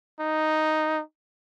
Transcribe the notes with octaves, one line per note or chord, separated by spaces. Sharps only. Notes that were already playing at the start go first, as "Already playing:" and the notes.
D#4